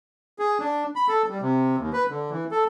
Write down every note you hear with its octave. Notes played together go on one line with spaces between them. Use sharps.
G#4
D4
B5
A4
G3
C3
D#2
B4
D3
E3
A4